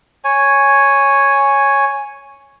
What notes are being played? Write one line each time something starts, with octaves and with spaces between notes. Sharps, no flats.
C#5 G#5